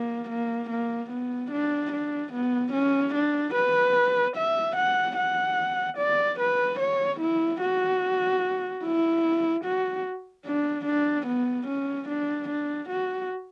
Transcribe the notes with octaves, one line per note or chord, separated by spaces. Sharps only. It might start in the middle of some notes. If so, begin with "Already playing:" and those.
Already playing: A#3
A#3
A#3
B3
D4
D4
B3
C#4
D4
B4
E5
F#5
F#5
D5
B4
C#5
E4
F#4
E4
F#4
D4
D4
B3
C#4
D4
D4
F#4